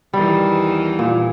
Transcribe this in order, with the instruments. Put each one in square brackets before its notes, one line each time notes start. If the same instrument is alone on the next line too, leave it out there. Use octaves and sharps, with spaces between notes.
[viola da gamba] E2 D#3 E3 [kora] G3
[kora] A#2